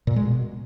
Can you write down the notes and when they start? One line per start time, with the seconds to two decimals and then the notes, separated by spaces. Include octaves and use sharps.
0.07 A#2
0.16 G#3
0.25 B2